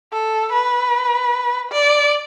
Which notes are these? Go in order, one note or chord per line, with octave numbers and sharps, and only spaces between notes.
A4
B4
D5